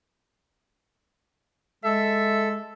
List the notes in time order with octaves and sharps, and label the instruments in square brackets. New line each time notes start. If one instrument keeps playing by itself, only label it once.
[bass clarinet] G#3 [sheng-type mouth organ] A4 [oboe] E5